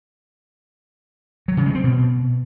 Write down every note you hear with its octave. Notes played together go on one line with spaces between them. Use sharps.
F#3
C#3
G#3
C4
B2